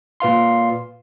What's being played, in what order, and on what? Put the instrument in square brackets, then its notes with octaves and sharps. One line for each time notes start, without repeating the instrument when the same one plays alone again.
[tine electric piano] A#2 B4 F5 C6